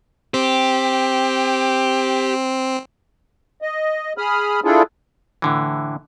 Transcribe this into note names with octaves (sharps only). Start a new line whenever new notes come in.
C4 G4
D#5
G#4 B5 D#6 F6
D4 E4 F4 G#4 A4
A2 D3 E3